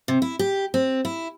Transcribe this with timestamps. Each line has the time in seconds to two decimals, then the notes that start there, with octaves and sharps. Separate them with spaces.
0.08 C3
0.22 E4
0.39 G4
0.74 C4
1.05 E4